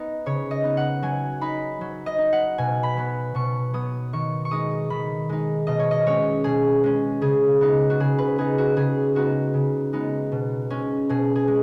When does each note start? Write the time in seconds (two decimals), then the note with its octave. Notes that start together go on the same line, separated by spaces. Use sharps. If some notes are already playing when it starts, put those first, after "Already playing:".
Already playing: B3 D#4 D#5
0.26 C#3 C#5
0.51 D#5
0.64 B3 D#4
0.77 F#5
1.02 F#3 G#5
1.41 D#4 B5
1.81 F#3
2.06 D#5
2.18 D#4
2.33 F#5
2.58 B2 G#5
2.83 B5
2.97 F#3 B3
3.35 B2 C#6
3.73 F#3 B3 D#6
4.13 D#3 C#6
4.45 C#6
4.51 G#3 D#4 D#6
4.90 D#3 B5
5.29 G#3 D#4
5.67 B2 D#5
5.79 C#5
5.91 D#5
6.06 G#3 C#4 C#5
6.44 B2 G#4
6.83 G#3 C#4
7.21 C#3 G#4
7.61 B3 D#4
7.90 F#4
8.00 C#3 G#4
8.18 B4
8.38 B3 D#4 G#4
8.58 F#4
8.76 C#3 G#4
9.15 G#3 B3 D#4 F#4
9.54 C#3
9.93 G#3 B3 D#4
10.32 B2
10.70 G#3 C#4
11.09 B2 G#4
11.36 G#4
11.48 G#3